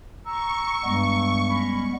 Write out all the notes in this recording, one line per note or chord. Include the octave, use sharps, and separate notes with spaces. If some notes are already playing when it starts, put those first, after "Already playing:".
A#5 C#6 E6
G2 G3 G#3 B3
C#4 D#5 B5